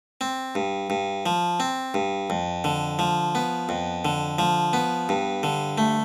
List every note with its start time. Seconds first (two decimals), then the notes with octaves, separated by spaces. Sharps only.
0.21 C4
0.55 G2
0.90 G2
1.26 F3
1.60 C4
1.94 G2
2.30 F2
2.64 D3
2.99 F3
3.35 B3
3.69 F2
4.05 D3
4.39 F3
4.73 B3
5.09 G2
5.43 D3
5.78 A3